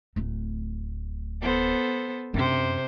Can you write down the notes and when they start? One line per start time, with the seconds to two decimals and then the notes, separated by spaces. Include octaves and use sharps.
0.16 D1 A3
1.41 B3 A4 C5
2.34 F#2 C3 D4 C5